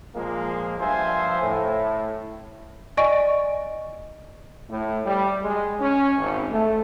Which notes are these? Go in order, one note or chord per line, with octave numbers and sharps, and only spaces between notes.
A#2 F3 G#3 A#3
G2 F3 F4 C5 E5 G#5
A2
D5 D#5 G#5 C#6 D7
A2
G3
G#3
C#4
G#1
A3